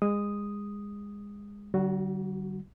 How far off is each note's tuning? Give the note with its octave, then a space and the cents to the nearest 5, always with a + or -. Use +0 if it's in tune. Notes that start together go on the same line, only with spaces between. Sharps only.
G#3 -25 D#6 +0
D3 +0 G3 -45 F#4 +0